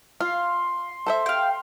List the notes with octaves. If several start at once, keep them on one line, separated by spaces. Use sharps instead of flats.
F4 F5 C6
A4 C5 E5
F5 G5